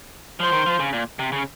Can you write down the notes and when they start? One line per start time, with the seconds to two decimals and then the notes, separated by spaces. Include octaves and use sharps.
0.40 F3 C5
0.53 D#3
0.66 F3
0.80 C#3
0.93 A#2
1.19 C3
1.32 C#3